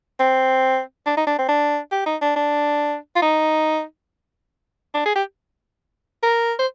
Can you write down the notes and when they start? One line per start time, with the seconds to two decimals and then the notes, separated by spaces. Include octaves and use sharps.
0.20 C4
1.06 D4
1.17 D#4
1.27 D4
1.39 C4
1.49 D4
1.92 G4
2.06 D#4
2.22 D4
2.36 D4
3.16 F4
3.22 D#4
4.94 D4
5.06 G#4
5.16 G4
6.23 A#4
6.59 C5